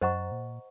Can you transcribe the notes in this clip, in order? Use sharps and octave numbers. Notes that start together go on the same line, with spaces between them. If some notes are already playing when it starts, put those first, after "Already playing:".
F#2 C5 D#5 F#5 A#5 C#6
A#2